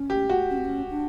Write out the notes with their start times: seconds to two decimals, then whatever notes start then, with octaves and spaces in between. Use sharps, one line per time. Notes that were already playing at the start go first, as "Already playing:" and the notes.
Already playing: C#4
0.10 G4
0.29 F#4
0.50 C#4
0.57 C4
0.64 C#4
0.90 D4